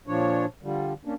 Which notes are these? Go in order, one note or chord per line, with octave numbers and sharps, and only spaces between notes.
A#2 F3 D4 C#5
D3 F3 G3
A#3 C#4 D4